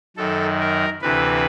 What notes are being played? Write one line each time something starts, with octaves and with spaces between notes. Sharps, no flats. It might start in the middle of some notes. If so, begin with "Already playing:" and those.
F#2 D#3 A4
A#4
D2 C3 E3 B4